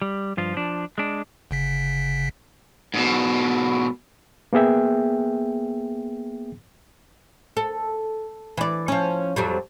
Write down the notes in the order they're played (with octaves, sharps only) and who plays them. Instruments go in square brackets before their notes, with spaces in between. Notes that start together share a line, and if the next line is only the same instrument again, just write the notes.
[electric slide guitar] G3
G2 F3 F4
F3 D4
G#3 D4
[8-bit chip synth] G1 C#3 B6
[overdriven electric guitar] G#2 B2
[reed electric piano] A#3 B3 G#4 E5 G5
[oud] A4
E3 D5
F3 C#4
F2 F#3 G3